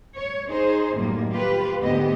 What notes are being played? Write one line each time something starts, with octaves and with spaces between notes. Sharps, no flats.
C#5
D#4 G#4 C5
F#2 A2 D#3 F#3 G3 A#3
F4 G4 B4
D2 G#2 B3 G4 D#5